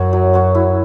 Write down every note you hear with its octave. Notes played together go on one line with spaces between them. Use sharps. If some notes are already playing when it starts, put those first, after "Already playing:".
Already playing: F#2 C#4 F#4 C#5
F#3
C#4 F#4 C#5
E4